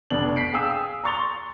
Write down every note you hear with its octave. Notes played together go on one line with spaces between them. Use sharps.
F1 B2 B3 D4 F#7
B6 C7 D7
G#4 F5 G5 G#5 D#6 E6
A#5 C6 C#6 A6 F7 G7